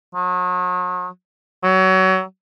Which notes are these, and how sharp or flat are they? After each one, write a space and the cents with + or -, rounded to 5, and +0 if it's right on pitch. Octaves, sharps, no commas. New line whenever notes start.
F#3 -40
F#3 +25